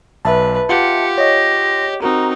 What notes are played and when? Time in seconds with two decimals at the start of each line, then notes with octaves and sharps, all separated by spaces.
0.25 B1 B4 E5 A5
0.69 F4 G4 F#5 C#7
1.18 C#5 D#5 A#6
2.02 C4 D#4 F#4 A#4 A#5